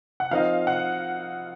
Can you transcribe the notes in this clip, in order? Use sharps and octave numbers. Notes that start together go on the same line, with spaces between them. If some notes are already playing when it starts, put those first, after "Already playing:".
F#5
F3 C4 D#4 A#4 D#5 F5
F#5